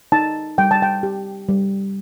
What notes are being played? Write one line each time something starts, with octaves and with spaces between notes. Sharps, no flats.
D#4 A5
G3 G5
A5
G5
G4
G3